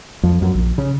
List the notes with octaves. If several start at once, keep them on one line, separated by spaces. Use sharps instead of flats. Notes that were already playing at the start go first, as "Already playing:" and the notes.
F2
F#2
A#1
C#3